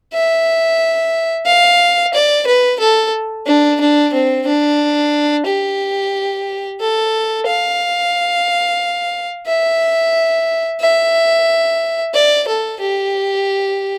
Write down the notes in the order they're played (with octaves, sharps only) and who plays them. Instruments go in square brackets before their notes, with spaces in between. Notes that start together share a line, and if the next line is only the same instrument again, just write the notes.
[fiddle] E5
F5
D5
B4
A4
D4
D4
C4
D4
G4
A4
F5
E5
E5
D5
A4
G4